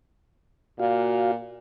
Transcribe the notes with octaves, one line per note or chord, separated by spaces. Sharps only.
A#2 F#4 F5